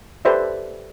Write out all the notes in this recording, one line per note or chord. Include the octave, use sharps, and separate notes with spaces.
G4 A4 B4 C5 D5 E5